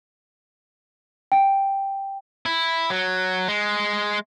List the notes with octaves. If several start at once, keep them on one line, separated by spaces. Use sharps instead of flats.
G5
E4
F#3
G#3